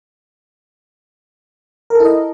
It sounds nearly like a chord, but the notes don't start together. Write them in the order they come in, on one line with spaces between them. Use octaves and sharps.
A#4 A4 E4 D#5